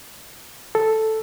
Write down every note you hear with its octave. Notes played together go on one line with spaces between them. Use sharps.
A4